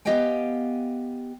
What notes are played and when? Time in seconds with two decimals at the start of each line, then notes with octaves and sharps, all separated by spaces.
0.05 B3 G4 D#5 F5 G5 G#5